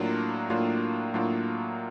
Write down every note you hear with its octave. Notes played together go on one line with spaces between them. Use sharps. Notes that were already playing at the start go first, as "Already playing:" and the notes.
Already playing: A2 F#3 A#3 D4 F4
A2 F#3 A#3 D4 F4
A2 F#3 A#3 D4 F4